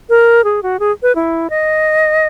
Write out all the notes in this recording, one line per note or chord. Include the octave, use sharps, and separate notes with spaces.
A#4
G#4
F#4
G#4
B4
E4
D#5